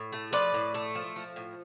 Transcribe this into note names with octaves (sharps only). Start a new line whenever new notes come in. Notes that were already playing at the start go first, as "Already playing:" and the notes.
Already playing: A2
A3
F3 B4 D5
A2
A3
F3
F3
A2